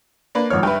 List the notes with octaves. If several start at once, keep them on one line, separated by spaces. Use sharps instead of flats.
A#3 D4 B4
G#1 F3 C#5 F6
G2 B4 E5 G5